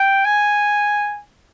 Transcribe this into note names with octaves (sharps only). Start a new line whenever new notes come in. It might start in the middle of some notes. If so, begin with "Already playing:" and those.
Already playing: G5
G#5